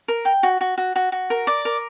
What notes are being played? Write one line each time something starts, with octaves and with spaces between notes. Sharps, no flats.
A#4
G5
F#4
F#4
F#4
F#4
F#4
A#4
D5
A#4